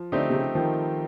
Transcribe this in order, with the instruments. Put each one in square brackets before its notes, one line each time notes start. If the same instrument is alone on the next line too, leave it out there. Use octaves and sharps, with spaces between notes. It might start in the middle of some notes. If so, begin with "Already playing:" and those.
Already playing: [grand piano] F3
[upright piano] D3 [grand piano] A3 C4 D#4 G4
[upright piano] C3
C#3
[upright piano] D#3 [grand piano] F3